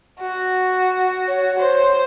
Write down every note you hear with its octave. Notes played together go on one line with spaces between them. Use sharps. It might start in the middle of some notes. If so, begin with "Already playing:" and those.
F#4
C#5
C5